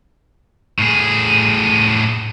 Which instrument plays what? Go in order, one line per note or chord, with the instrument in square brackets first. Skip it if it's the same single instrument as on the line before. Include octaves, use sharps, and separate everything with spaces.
[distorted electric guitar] A2 G#4